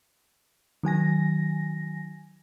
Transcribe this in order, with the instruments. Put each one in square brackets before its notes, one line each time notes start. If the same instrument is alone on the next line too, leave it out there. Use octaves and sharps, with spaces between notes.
[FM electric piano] D#3 F#3 G#5 A#6